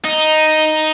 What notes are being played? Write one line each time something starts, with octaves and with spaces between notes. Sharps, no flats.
D#4